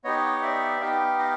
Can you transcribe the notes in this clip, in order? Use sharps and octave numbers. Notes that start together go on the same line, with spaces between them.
B3 D#4 G4 C#5 D#5
D5 E5
B3 D#4 G4 F5 G5
D#5 F5